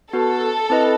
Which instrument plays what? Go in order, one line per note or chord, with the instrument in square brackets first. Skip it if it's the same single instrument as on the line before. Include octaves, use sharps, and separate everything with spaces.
[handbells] B3 F#4 B4 [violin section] A4
[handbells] C4 E4 B4 D#5